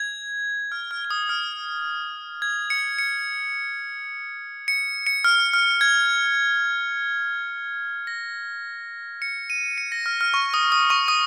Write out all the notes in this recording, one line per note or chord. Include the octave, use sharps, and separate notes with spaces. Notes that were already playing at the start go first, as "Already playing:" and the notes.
Already playing: G#6
F6
F6
F6
D#6
F6
G#6
C#7
C#7
C#7
C#7
F6
F6
G#6
A#6
C#7
D#7
C#7
A#6
F6
F6
C#6
D#6
D#6
C#6
D#6